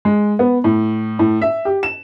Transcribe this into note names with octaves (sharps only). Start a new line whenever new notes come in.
G#3
B3
A2
A2
E5
G4
E7